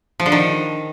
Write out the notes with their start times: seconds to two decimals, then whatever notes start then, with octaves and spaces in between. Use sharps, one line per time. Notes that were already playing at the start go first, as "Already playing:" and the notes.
0.20 F3
0.26 D3
0.32 D#3